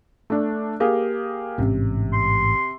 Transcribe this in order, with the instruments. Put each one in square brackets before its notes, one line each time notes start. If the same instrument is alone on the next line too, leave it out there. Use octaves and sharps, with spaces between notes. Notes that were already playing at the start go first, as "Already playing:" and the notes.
[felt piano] A3 D4
A#3 G4 G#4
[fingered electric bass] A1 G#2 C#4 [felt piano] C3
[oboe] C6